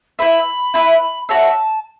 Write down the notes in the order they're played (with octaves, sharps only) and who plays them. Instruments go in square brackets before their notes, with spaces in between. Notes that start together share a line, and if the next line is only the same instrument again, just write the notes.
[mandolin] E4 B4 E5 [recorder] B5
[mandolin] E4 B4 E5
[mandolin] F#4 C#5 E5 [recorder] A5